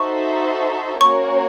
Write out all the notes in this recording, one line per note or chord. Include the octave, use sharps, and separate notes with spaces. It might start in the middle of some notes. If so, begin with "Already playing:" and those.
Already playing: D#4 F#4 A4 C5 E5 C#6
A#3 C#4 F#4 A#4 C#5 C#6